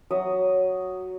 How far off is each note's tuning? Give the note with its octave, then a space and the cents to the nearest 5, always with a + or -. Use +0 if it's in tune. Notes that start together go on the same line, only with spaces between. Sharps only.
F#3 +0 E5 +0 D#6 +0